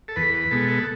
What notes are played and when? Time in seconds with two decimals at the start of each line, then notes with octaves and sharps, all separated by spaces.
0.08 A4
0.16 E2 B4
0.34 B4
0.51 B2 G#3 B3 A4
0.69 A4